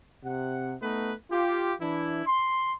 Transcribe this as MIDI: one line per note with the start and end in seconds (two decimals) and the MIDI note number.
0.24 0.74 48
0.24 0.74 78
0.82 1.12 57
0.82 1.12 59
0.82 1.12 63
0.82 1.12 71
1.31 1.72 65
1.31 1.72 67
1.81 2.24 52
1.81 2.24 62
1.81 2.24 64
2.26 2.73 84